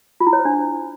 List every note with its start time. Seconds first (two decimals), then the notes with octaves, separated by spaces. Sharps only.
0.20 F4
0.27 E4
0.33 C#5
0.39 C5
0.45 D4